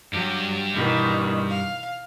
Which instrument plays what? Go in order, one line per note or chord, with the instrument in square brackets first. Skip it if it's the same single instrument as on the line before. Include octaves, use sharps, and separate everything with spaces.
[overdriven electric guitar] G2 G4 [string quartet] F#3
[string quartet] B2 D#3 E3
F5